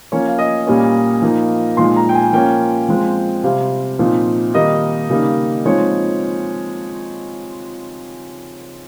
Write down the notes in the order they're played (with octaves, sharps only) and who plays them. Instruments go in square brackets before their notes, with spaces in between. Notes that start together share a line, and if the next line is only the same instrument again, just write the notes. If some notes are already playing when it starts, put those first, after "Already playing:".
[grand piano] F3 A#3 C#4 C#5
F5
D#5
A#2 G3 A#3 C#4
F3 A#3 D#4
A#2 F3 G#3 D#4 C6
A#5
G5
G#5
F3 A#3 C#4 G5
F3 G#3 C4
C3 G3 C4 F5
A#2 F3 C4 D#4
D#3 G3 A#3 D#4 D#5
C#3 G3 A#3 D#4
F3 G#3 C4 D#4 C#5